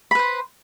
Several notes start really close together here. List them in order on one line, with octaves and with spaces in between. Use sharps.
B5 B4 C5